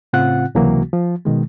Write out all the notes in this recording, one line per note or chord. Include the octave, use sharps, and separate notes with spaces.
A2 C#3 C4 F4 F#5 F#6
C#2 C3 E3 F#3 A#3 F#4
F3
B2 D#3 G#3